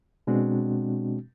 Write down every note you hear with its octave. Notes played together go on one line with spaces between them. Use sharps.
B2 G#3 C4 D4 F#4